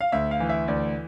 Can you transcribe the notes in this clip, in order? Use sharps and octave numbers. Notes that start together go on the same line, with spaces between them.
F5
D2 E5
F5
E3
E5
D2 D5